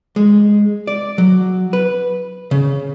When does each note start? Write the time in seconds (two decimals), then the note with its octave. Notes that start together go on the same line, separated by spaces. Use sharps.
0.16 G#3
0.87 D5
1.18 F#3
1.73 B4
2.51 C#3